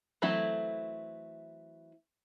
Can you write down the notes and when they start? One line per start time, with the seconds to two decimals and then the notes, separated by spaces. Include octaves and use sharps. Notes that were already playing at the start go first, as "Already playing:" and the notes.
0.22 E3 F#3 A3 C4 E4